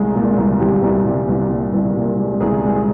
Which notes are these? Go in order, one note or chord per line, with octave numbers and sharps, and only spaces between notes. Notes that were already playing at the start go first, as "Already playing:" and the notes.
Already playing: C2 G#3
A#2
C2
C2 G4
C2
C2
C2
A#2
C2
A#2
G#3
C2 G#4
G#3